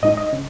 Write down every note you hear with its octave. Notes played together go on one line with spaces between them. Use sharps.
A2 G#3 D#4 D#5
D#5
C#3